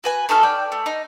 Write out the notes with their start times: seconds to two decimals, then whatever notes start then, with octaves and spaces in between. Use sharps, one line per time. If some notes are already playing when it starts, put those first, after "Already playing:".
0.04 F#4 B4 G#5
0.29 A3 D#4 A4 F6
0.43 D5 G5
0.72 A3
0.86 D#4